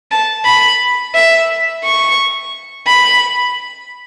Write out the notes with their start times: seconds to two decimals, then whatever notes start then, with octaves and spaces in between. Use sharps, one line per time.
0.11 A5
0.45 B5
1.15 E5
1.84 C#6
2.87 B5